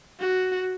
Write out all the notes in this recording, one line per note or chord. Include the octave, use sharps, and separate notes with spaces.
F#4